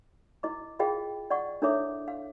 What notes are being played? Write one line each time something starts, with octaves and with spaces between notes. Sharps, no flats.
E4 D#5 D6
F4 G#4 D#5 F5 G5
D5 D#5 F#5 C#6
D4 E4 A4 C#5 E5 D6
F5